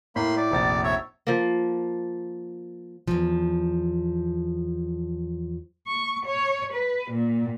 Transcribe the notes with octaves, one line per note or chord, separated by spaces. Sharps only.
A2 A#3 B5 C6
D5
F1 A#1 A6
C#5 E5
F3 A#3
E2 G2 F3
C#6
C#5
B4
A#2